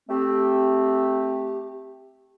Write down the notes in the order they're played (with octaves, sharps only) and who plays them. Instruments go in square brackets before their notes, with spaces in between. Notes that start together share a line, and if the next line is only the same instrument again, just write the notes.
[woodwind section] A3 C4 [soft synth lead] G4